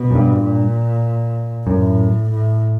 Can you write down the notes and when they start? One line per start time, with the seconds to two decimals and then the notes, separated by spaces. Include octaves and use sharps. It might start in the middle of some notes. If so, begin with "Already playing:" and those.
Already playing: B2
0.11 F#2
0.15 G2
0.37 A#2
1.67 F#2 A2
2.31 A2